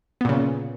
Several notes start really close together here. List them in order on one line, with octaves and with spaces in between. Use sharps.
B3 A#2 C#3